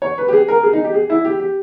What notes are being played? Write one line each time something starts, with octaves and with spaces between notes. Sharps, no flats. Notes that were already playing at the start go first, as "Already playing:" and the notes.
C#5
B4
G4
G#4
A#4
G#4
D#4
G4
G#4
E4
G4
G4